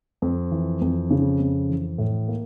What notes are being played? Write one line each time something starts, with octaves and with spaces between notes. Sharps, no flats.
F2
E3
F2
C#3
F2
E3
A2
A#3